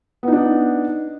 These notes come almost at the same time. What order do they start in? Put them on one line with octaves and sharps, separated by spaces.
B3 D#4 D4